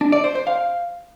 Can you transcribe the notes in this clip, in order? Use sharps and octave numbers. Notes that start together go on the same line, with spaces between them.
D4
D5
C5
C5
F5